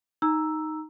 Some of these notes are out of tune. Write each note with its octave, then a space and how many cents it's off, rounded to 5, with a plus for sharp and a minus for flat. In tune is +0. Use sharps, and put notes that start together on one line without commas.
D#4 +0 A#5 +0 E6 +0